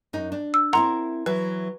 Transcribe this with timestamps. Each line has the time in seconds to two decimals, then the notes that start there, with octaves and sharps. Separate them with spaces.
0.13 F#2 D#4
0.32 D4
0.54 E6
0.73 C4 E4 A#4 F#5 A#5 C6
1.26 E3 F#3 B4